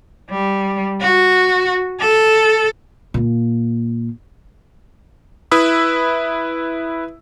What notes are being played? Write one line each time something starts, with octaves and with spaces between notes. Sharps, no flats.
G3
F#4
A4
A#2 A#3
E4 B4 E5 D#6 E6